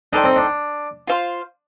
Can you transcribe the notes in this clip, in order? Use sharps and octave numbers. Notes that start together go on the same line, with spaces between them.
D4 D#4 A4 C5 G5
C4
D4
F4 C5 F5 C6